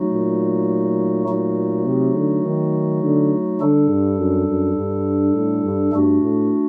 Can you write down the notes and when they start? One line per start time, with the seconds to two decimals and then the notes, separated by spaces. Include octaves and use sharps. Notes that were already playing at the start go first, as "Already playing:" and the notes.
Already playing: F#3 A3 D#4 F#4
0.12 A#2
1.28 F#3 A3 D#4 F#4
1.86 C3
2.16 D3
2.44 D#3
3.02 D3
3.60 D3 G3 D4 A4
3.89 G2
4.18 F#2
4.47 F#2
4.75 G2
5.34 A2
5.63 G2
5.92 G2 A3 D4 F#4
6.21 A2